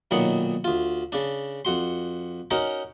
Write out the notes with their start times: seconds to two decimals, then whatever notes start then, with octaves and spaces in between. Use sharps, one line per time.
0.11 B1 A#2 D#3 B3 C#5
0.64 D2 F4
1.12 C#3 D4
1.65 F2 F#4 C6
2.51 C#4 D#4 F#4 A#4 C#5